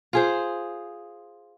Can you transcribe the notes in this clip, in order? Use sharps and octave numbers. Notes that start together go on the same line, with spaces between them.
F4 G#4 C5